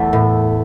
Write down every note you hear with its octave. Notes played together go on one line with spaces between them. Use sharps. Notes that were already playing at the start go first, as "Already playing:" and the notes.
Already playing: E2 A3
A2